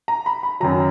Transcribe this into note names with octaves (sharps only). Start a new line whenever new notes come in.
A#5
B5
B5
F#2 D#3 F#3 A#5